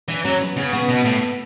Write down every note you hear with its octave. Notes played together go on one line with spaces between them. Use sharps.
E3 D4
F#3 C#4
B3
C#3 B3
B3
B2
A2